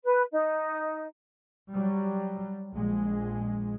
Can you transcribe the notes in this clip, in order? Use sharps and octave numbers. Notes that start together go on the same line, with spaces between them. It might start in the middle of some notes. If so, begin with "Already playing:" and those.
B4
D#4
F#3 G3
A#1 G#3